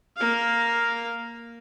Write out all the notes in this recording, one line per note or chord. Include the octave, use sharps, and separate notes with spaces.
A#3 F5